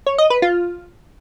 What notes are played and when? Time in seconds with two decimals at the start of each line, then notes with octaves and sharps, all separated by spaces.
0.07 C#5
0.18 D#5
0.30 B4
0.42 F4